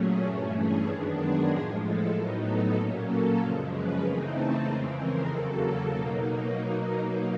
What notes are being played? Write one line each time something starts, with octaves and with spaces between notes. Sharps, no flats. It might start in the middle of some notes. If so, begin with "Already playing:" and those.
Already playing: A#2 F#3 A3 C#4 G#4
G2 E3 A3 C#4 A4
G#4
F#2 D#3 G#3 B3 D4 A4
G#4
A2 F3 G#3 G#4
A4
A2 F#3 B3 D#4 A#4
A4
A#2 F#3 A#3 C#4
A4
F#2 C#3 F3 G#3 A#4
B4
C#3 E3 A3 C4 D#4 A#4
A4
F2 C#3 E3 G#3 C4 A#4
A#4
E2 C#3 F#3 A#3 A4
B2 F#3 A#3 D#4